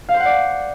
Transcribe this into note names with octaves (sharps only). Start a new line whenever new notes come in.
F5
C5
F#5
D5